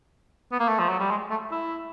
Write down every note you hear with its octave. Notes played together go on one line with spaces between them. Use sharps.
B3
A#3
A3
F3
F#3
G3
G#3
A3
E4